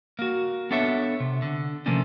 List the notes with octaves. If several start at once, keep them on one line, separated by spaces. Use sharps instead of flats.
A#3 F#4
B3 D4 A4 C#5 E5
C3
D3
C3 F3 A3 A#3 C#4 D4